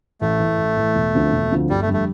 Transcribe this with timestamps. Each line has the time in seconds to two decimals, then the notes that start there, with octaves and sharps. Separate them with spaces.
0.21 A1 A3
0.40 A2 E3
0.58 A1
0.76 A2 E3
0.95 E1
1.14 D2 D3 F3 C4
1.32 E1
1.51 D2 D3 F3 C4
1.69 G1 G3
1.82 A3
1.87 F2 D3 G3
1.94 A3